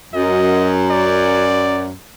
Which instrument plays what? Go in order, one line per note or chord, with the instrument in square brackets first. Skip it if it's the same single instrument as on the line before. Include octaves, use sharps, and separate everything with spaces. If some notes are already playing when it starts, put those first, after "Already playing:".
[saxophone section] F#2 [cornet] D#5
[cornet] D5